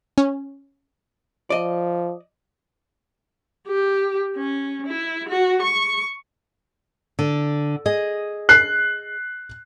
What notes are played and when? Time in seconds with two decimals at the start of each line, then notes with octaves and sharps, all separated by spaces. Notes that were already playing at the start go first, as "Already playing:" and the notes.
0.18 C#4
1.50 F3 D5 D#5
3.68 G4
4.36 C#4
4.86 E4
5.29 F#4
5.62 C#6
7.19 D3
7.86 G#4 D#5
8.49 F#6 C7